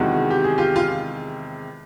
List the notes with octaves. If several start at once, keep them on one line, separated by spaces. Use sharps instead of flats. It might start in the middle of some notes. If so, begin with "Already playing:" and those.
Already playing: E2 C3 D#3 G#3 F#4
G4
G#4
F4 G4
F4